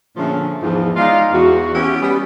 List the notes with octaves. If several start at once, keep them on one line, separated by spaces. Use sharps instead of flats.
A#2 D3 F3 A3 C#4 G#4
E2 G#2 F3
G#3 D#4 F4 D5 F5
E2 F#4
B3 C#4 E4 G4
G3 B3 C#4